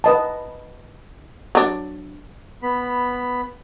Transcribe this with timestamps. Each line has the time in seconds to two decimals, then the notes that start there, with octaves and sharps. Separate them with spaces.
0.04 B4 D#5 A5
1.55 F#3 D4
2.63 B3 B5